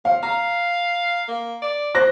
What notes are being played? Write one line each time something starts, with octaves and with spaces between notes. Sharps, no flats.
F3 F5
F5 A#5
A#3
D5
C5 F#6 A#6